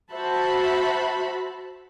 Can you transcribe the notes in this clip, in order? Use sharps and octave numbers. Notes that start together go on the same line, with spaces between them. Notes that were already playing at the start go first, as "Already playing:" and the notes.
F#4 C5 E5 A5 B5